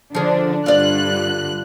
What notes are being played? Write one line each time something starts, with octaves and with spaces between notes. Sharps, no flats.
D3 F3 D4 G#4
G2 D3 F4 D5 F#6